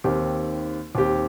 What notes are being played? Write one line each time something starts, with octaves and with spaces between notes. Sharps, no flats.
D#2 D#3 C4 G4
D#2 D#3 C4 G4